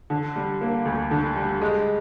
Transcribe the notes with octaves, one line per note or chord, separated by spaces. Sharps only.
D3
G3
A#3
D2
D3
G3
G#3